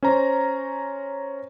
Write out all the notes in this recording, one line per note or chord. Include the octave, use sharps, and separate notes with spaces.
C#4 C5 A#5